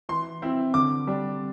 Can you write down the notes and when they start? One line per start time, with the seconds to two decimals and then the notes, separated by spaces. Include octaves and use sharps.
0.09 E3 C6
0.42 C4 E4
0.74 D3 D6
1.07 G3 D4